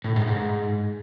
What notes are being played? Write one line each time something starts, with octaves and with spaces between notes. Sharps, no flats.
A2
G#2
G#2